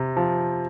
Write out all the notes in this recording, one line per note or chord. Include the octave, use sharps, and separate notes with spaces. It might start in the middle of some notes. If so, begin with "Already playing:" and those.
Already playing: C3
F3